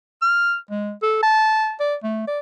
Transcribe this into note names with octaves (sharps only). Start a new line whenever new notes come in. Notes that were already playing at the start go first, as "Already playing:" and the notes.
F6
G#3
A4
A5
D5
A3
D5